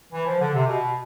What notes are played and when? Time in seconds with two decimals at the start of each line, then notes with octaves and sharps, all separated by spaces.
0.13 E3
0.26 F3
0.40 D3
0.54 C3
0.67 B2